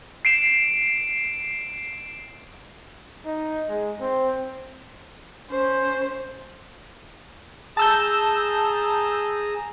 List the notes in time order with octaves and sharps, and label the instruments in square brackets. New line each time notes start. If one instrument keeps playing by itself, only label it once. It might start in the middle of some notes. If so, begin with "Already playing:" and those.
[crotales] C7 D7 E7
[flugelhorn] D#4
G#3
C4
[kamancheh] C#4 C5
[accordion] G#4 A#5 D#6 [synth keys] A5 E6 G6